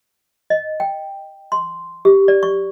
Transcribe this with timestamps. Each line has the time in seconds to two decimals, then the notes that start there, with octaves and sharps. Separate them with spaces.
0.50 D#5
0.80 G5
1.52 C6
2.05 G4
2.28 D5
2.43 C#6